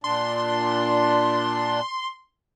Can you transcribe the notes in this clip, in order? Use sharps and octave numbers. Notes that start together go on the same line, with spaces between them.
A#2 D4 C6